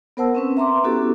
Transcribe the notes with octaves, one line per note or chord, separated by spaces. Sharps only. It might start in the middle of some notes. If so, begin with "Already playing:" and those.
B3 A#4 C5 F#5 A5 E6
C4 C#4 B4
E5 A#5 C6 D6
B3 C#4 E4 F#4 G4 A4